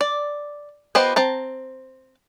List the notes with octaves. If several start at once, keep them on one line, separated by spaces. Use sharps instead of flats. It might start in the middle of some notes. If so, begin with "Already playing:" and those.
D5
B3 F4 G4 C5 D#5
C4 A5 A#5